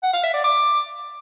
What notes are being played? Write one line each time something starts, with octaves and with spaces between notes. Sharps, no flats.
F#5
F5
E5
D5
D6